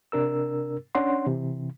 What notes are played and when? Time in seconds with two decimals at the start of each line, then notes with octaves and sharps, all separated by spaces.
0.12 C3 D4 A#4 E6
0.95 C#4 D4 C#5 F#5 C6
1.27 C3 E3